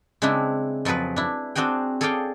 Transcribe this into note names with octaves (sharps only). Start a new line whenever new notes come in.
C#3 G#3 C4 D4 E4
F2 F3 F#3 G#4 B4
D4 E4
C4 D4 F#4 G#4 G5
G#4 A4 C#5 D5 F5 G5